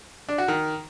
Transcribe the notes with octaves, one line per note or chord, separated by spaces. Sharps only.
D4
F#4
D#3